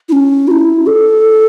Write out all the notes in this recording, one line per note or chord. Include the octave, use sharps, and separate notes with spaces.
E4
C#4
F#4
E4
A4